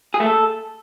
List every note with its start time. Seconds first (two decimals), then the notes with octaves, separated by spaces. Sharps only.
0.14 G#4
0.20 A3
0.26 A4